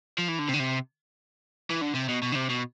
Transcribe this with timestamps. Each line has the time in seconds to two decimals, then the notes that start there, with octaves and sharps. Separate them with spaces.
0.18 F3
0.29 E3
0.39 D3
0.48 C3
0.54 D3
0.60 C3
1.70 E3
1.82 D3
1.95 C3
2.09 B2
2.22 B2
2.32 D3
2.35 C3
2.49 B2